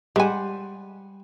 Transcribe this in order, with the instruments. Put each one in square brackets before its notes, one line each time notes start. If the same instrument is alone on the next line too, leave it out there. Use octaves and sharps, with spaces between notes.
[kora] G3 C5 F#5 [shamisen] G#3 G#5